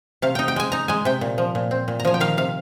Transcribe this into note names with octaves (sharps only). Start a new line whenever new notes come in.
C3 F5
D#4 G5
G5
G#3 G#5
D#4 A#5
G#3 G#5
C3 G5
A#2
F3
A#2
C4
A#2
A#5
F3 G#5
G5
D#3 F5
C3 F5